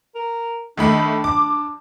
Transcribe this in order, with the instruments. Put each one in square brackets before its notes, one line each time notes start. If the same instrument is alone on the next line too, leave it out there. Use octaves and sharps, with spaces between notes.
[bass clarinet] A#4
[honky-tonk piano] D#3 A3 B5 [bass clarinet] D4
[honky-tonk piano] D6